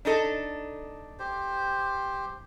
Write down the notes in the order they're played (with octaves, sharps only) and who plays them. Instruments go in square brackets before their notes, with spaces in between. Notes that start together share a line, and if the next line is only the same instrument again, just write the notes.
[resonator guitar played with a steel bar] D4 D#4 A4
[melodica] G4 C5